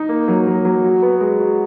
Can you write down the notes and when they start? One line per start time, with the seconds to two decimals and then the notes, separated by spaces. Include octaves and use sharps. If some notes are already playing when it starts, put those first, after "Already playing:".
Already playing: D#4
0.09 A#3
0.28 F#3
0.46 F#3
0.65 F#3
0.84 F#4
1.02 B3
1.21 G#3
1.39 F#4